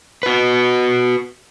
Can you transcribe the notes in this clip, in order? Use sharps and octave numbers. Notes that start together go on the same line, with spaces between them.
F#4 B4